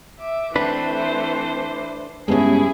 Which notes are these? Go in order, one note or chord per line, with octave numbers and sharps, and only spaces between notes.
E5 D6
E3 A3 C4 D4 B4 C5
G2 C#3 G#3 B3 C#4 E4 G#4